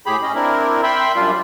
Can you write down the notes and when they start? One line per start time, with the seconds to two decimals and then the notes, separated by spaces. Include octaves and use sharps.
0.06 A2 G4 G#4 B5
0.23 C#4 D#5
0.35 C4 D4 E4 A#4
0.83 E5 G5 B5 C6
1.16 F#2 G3 D4 F4